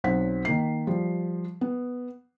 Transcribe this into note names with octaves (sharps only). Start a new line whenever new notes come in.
B1 F#3 C4 C5 F#5 B6
D#3 A#3 C7
F3 G3
B3